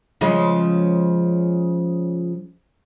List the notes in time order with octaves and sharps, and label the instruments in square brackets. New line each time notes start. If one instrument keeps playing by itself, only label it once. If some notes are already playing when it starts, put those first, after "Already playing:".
[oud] C#3 F3 G#3